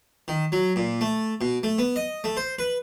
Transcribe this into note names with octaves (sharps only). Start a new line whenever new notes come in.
D#3
F#3
A#2
A3
B2
A3
B3
D#5
A3
C5
B4